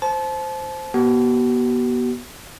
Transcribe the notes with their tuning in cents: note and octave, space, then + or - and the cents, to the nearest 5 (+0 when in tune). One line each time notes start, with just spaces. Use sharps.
C5 +0 A5 -30
B3 -30 F#4 +45